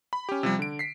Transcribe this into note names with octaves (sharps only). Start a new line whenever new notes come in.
B5
C#4 G4
C3 F3 G3
D3 D7
B6 C7